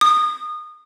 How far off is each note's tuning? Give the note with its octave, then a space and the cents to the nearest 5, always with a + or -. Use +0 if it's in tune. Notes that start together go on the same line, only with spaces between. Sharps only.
D#6 -25